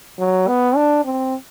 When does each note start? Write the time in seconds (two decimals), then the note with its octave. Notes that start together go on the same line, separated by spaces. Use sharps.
0.19 F#3
0.48 B3
0.76 D4
1.05 C4